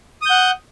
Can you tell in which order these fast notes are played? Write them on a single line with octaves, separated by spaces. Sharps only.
D#6 G6 F#5